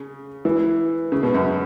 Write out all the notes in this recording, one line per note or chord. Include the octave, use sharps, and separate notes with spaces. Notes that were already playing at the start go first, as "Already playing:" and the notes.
Already playing: C#3
E3
C#3
B2
F#2